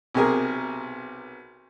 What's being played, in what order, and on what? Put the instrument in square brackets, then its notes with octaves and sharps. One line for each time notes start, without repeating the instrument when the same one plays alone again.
[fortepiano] B1 C3 G#4 A#4